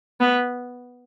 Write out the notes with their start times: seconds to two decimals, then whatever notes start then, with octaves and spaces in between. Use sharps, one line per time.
0.20 B3